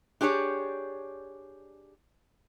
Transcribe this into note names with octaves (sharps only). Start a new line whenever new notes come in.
D4 G4 G#4 C#5